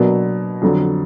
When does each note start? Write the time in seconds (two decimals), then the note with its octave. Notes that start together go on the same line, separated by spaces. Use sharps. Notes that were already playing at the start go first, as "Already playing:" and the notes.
Already playing: B2 F#3 A#3 D4
0.62 F2 D3 F#3